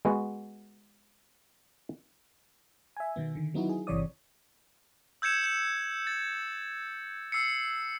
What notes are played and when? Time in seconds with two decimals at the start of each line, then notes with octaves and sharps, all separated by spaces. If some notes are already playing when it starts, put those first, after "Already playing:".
0.05 G#3 B3 F#4
2.97 E5 G#5
3.16 B2 D#3 B3
3.35 D3 D#3
3.54 F#3 B3 D#4 E4 F#4
3.69 G#4
3.87 G1 C3 E3 C#5 D5 D#6
5.22 E6 G6 G#6 C#7 E7
5.44 G6 C#7
6.07 A6
7.32 E6 C7 C#7